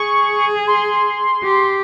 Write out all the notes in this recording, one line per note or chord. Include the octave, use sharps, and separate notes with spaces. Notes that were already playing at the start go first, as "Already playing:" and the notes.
Already playing: G#4 C#6
C6
G4